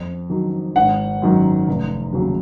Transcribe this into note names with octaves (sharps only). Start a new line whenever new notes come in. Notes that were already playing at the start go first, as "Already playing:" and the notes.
Already playing: F2
D#3 F#3
G#1 F#5
F#2 D#3 F#3
F1
D#2 C#3 F#3